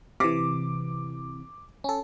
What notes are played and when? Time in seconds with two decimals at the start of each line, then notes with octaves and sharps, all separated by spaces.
0.20 C3 E3 D6
1.84 C#4 A4